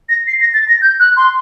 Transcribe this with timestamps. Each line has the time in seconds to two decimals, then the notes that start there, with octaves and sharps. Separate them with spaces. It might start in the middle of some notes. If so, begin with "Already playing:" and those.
0.09 A#6
0.27 C7
0.40 A#6
0.54 A6
0.68 A#6
0.82 G6
1.00 F#6
1.17 C6